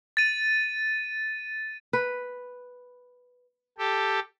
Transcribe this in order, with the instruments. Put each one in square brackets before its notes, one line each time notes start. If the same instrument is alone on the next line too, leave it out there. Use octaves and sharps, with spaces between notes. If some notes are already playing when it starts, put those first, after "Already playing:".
[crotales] A6 D#7
[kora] B4
[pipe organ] G4 A4